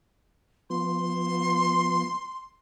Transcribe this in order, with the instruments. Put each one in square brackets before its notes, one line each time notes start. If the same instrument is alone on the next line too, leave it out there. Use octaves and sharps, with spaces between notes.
[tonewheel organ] F3 B3 [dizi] C6